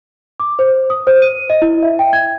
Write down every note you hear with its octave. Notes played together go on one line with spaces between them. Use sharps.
D6
C5
D#6
C5
D#7
D#5
E4
E5
G5
G#6